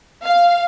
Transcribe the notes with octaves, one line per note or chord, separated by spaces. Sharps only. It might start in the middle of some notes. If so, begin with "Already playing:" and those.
F5